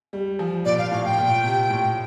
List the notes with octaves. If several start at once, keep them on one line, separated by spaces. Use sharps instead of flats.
G3
F3
A#2 D5
F5
A2 F5
G5
A#2
C3
A2